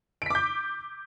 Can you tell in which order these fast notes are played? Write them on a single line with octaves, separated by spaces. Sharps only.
D7 B6 D6 G6